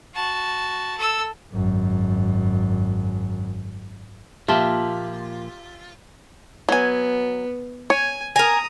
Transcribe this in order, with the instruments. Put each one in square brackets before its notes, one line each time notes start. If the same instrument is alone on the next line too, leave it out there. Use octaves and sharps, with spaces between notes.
[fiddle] F#4 A5
A4 E6
[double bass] G#1 F#2
[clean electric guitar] A#2 F3 A#3 [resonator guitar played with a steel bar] F4 [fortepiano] G4 E5 [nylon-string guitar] A5
[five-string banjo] F#3 G#5 [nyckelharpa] B3
[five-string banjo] C#5 [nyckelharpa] G#5
[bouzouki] A#4 G#5 [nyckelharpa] A#5 D#6